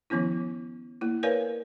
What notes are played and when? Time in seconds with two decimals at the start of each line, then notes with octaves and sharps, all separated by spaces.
0.10 D#3 F3 B3 C#4 E4
1.01 A#3 E4
1.23 A#4 B4 C#5 D5 F5 G#5